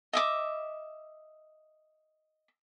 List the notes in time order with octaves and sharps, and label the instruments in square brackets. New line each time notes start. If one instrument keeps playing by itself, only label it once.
[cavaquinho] D#5 E5 D6